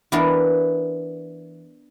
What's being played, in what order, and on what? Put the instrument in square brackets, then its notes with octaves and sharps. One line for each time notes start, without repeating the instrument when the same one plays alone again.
[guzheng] E3 B3 D4 A#4